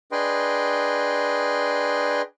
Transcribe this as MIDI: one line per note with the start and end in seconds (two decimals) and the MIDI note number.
0.12 2.22 62
0.12 2.22 68
0.12 2.22 71
0.12 2.22 75
0.12 2.22 79
0.12 2.22 84